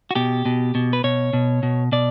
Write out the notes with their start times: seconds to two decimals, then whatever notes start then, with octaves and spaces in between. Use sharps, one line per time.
0.11 F#4
0.15 B2 G4
0.45 B2
0.75 B2
0.93 B4
1.04 B2 C#5
1.33 B2
1.63 B2
1.92 B2 D5